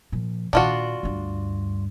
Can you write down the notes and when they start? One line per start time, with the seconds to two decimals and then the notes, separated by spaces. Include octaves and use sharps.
0.12 A#2 F3
0.53 A#2 D#3 D4 F4 F#4
1.03 D2 G2